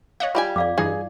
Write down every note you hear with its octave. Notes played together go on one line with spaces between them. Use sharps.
C#5 D#5 F5 F#5
G3 F4 G4 G#5 B5
F2 D5 F5 D6
G2 E3 D#4 G#4